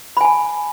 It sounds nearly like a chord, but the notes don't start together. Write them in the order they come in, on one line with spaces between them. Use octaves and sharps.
B5 G#5 A5